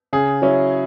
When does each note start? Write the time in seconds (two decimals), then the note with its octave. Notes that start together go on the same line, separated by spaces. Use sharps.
0.13 C#3 G#4
0.42 F#3 C#4 E4